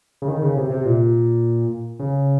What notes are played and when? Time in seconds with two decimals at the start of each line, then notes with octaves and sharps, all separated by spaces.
0.22 C#3
0.28 D#3
0.42 C#3
0.57 C3
0.71 C3
0.86 A#2
2.00 C#3